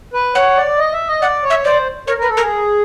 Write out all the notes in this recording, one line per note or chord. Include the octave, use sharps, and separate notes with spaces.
B4
C#5 F#5
D5
D#5
E5
D#5
D5 F#5
C#5
E5
C5 D5
A#4 C#5
A#4 B4
A4
A#4
G#4